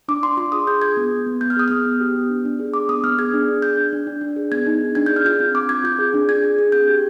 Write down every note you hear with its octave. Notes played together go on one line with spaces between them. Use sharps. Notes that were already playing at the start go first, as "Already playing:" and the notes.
D4 D6
D4 C6
F4 C6
G#4 D#6
G#4 G6
G#4 G#6
B3
B3
B3
B3 G6
F6
G#4 D#6
B3 F6
B3
G4
B3
D4
D4
G#4
D4 D6
B3 D#6
B3 F6
G#4 G#6
D4
G#4
D4 G6
D4
D4
D4
D4
G#4
B3 G#6
D#4
G#4
D4 G#6
G#4 G6
F6
F4 G6
C4
C4 D6
C4 G#6
F4 G6
G#4
D4
G#4 G#6
G#4
G#4
C4 G6
G4